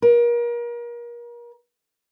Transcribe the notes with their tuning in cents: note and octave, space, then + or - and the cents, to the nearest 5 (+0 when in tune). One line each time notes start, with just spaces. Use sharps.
A#4 +35